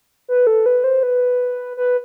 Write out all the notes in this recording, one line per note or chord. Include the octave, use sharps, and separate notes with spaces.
B4
A4
B4
C5
B4
B4